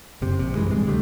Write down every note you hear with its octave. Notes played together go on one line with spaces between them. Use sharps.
F#1 C3
A#1 C3
G2 E3 G#3
D#1 C3 G3 G#3
C#2 D3 G3 A3